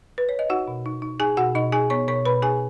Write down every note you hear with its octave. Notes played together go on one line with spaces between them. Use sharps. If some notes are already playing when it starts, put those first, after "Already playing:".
B4
C#5
D#5
D#4 F#4 F#5
B2
D#4
D#4
D#4 G#4 G#5
B2 F#4 F#5
B2 D#4 D#5
D#4 G#4 G#5
B3 C#5 C#6
B2 C#5 C#6
B2 B4 B5
D#4 G#4 G#5